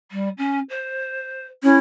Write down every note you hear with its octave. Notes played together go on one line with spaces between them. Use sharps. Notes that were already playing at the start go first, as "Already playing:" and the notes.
G3
C#4
C5
C#4 E4